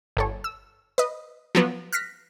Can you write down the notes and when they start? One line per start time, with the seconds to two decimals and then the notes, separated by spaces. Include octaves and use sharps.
0.17 G1 A4 C#5
0.44 E6
0.98 B4 D#5
1.55 F3 F#3 B3
1.93 F6 F#6 A#6 B6